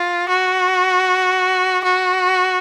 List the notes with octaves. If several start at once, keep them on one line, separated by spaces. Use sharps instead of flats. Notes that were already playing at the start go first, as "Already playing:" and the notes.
Already playing: F4
F#4
F#4